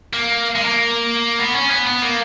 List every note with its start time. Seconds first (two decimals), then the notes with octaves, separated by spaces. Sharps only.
0.13 A#3
0.56 G#3
0.66 A#3
1.39 B3
1.55 C#4
1.71 B3
1.87 B3
2.02 A#3